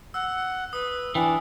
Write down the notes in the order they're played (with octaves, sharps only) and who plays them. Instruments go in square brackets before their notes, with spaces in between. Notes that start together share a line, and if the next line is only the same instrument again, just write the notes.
[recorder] F#5 [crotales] E6
[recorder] B4 [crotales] D#6
[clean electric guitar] E3 [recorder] D4 [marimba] G5 G#5